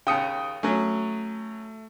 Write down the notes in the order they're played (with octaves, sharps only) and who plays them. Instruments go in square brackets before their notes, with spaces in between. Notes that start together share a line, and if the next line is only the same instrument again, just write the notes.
[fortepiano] D#2 C#3 [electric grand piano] G5 D#6 C#7
[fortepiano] F#3 C#4 [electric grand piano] A3